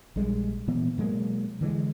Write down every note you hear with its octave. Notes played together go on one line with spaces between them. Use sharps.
A#1 G3 G#3
A#2 E3 B3
B2 F#3 G#3 A#3
D3 E3 G3 G#3